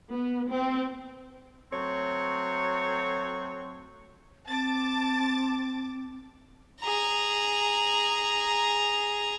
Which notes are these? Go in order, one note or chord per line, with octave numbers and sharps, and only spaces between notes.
B3
C4
F#3 A3 C4 C#5
C4 A5 D6 A6
G#4 A#5